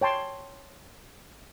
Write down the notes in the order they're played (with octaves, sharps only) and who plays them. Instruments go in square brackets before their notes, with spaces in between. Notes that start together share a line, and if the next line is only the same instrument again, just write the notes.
[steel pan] C#5 G5 A5 C6